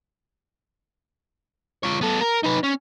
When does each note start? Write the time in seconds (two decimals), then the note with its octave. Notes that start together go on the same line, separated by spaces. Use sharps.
1.83 F4 C#5
2.01 B3 A4
2.21 A#4
2.44 D#4 B4
2.64 C#4